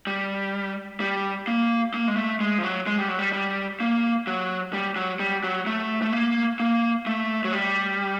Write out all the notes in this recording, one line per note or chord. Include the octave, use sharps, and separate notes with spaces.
G3
G3
A#3
A#3
G#3
A3
G#3
F3
F#3
G#3
G3
F#3
G3
G3
A#3
F#3
G3
F#3
G3
F#3
A3
A3
A#3
A#3
A3
F#3
G3